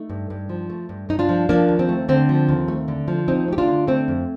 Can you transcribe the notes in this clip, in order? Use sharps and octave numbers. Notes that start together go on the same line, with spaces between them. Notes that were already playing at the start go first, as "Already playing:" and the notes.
Already playing: A3 D#4
G2
G2
F3
A3
G2
G2 D#4
D4 F4
F3
F3 A#3 D4
D#2
C4
A3
D3 C4
F3
D#2
A3
D3
F3
D#2 C4 D#4
A3 G4
D4 F4
D3
A3 C4
F2